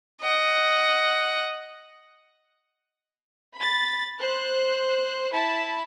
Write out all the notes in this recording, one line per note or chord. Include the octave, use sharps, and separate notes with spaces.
D#5 F#5
B5 A6
C5 F#6
E4 A5 B5